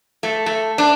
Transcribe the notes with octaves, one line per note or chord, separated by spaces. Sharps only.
A3
A3
D4